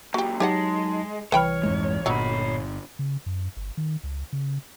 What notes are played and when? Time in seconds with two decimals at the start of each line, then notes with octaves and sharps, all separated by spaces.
0.14 F#2 A#2 F#4 G4
0.40 F#3 G#3 D#4 G4 C#5 F#5 A5
1.32 C2 E3 B4 C#5 G5 B5 F6
1.63 F2 G#2 G#3
2.06 G1 A#2 F#3 D#4 C#5 B5
2.99 C#3
3.26 F#2
3.57 G1
3.77 D#3
4.03 C#2
4.33 C#3